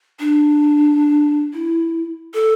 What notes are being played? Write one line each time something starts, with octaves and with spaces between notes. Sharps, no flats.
D4
E4
A4